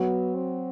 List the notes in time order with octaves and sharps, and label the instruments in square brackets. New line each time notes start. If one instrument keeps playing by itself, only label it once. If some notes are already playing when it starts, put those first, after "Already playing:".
Already playing: [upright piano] F#3 [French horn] B3
[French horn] C4